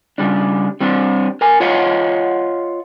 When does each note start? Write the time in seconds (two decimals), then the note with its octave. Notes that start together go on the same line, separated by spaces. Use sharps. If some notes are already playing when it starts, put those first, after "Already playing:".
0.18 C#3 G3 D4
0.80 G3 C4 D4
1.41 A#4 G#5
1.60 F4 C#5 D#5 F5 F#5